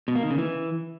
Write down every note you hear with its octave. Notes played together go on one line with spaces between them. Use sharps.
B2
A#3
D#3
C#3
E3